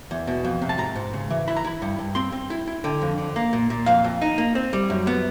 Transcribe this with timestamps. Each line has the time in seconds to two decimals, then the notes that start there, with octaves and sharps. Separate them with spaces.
0.11 E2
0.27 B2
0.44 F2
0.62 C3
0.69 A5
0.78 G#2 A#5
0.95 G#2
1.14 C#3
1.30 E3
1.48 E4 B5
1.57 A#5
1.65 E4 B5
1.82 G2
1.99 G2
2.15 C4 C6
2.32 C4
2.50 E4
2.68 E4
2.84 D3 G5
3.02 F2
3.18 D3
3.36 A#3
3.53 A#2
3.70 A#2
3.86 F2 F5
4.04 F2
4.22 D#4
4.38 A#3
4.55 C4
4.73 G3
4.90 F#2
5.07 B3